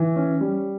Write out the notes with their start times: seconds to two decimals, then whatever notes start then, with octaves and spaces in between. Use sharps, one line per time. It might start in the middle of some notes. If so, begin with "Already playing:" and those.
Already playing: E3
0.16 C#4
0.41 G3